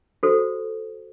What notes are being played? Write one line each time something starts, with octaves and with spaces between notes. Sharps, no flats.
F#4 A4 C5